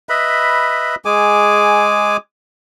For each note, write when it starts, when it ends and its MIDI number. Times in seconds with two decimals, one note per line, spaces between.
0.09 0.95 71
0.09 0.95 75
0.09 0.95 76
0.09 0.95 83
1.05 2.17 56
1.05 2.17 68
1.05 2.17 80
1.05 2.17 86